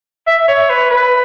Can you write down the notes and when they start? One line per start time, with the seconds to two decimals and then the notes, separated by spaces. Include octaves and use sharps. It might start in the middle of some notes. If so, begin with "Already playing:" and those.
0.27 E5
0.48 C#5
0.70 B4
0.90 B4